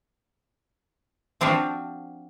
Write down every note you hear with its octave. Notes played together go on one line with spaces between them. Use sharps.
F3 C4 D4 F4 F#4